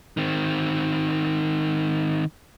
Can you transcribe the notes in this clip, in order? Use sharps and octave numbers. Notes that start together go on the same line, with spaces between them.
D#3 C4